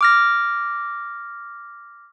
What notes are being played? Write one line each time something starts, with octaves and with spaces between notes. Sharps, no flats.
D6 F6 A#6